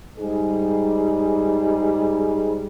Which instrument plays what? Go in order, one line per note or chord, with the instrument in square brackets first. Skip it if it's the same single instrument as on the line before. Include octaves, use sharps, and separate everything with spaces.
[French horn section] G#2 G3 D#4 G#4